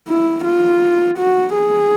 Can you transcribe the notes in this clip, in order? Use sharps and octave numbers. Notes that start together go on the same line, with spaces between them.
E4
F4
F#4
G#4